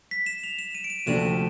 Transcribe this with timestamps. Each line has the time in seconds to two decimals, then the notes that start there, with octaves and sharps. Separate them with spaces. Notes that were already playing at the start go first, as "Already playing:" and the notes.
0.11 B6
0.26 E7
0.44 F7
0.59 E7
0.75 D#7
0.84 D7
0.90 D#7
1.06 D2 C3 F3 A3 D4 E7